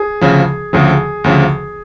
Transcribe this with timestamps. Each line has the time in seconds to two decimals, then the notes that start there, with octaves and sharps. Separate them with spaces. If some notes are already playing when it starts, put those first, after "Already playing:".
Already playing: G#4
0.21 D2 C#3 F3
0.73 D2 C#3 F3 G#4
1.24 D2 C#3 F3